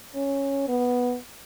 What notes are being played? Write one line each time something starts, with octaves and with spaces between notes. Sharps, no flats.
C#4
B3